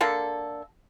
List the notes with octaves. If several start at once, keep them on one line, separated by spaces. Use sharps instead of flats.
D3 A#3 A4